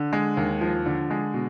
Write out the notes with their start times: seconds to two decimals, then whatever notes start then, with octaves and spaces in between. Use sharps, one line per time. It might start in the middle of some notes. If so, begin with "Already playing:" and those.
Already playing: D3
0.13 G#3
0.37 D#2
0.61 F3
0.86 D3
1.11 G#3
1.34 B2